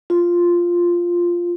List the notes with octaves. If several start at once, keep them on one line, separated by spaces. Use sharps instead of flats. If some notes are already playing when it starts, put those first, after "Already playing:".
F4